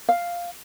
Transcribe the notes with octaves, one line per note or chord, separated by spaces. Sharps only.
F5